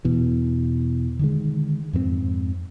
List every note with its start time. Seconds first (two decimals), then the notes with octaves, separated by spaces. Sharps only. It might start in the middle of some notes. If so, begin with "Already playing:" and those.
0.05 E2 B2 E3
1.19 D3 D#3 G#3
1.93 F2 G#2 A3 C4